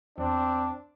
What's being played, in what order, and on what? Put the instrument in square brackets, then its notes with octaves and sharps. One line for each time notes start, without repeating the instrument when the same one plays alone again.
[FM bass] E2 [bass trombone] C4 [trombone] D4